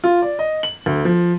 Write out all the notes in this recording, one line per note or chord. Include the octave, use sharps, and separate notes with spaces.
F4
D5
D#5
F#7
D2
F3